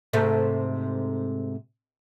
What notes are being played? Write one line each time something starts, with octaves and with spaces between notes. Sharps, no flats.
G#2 C3 A3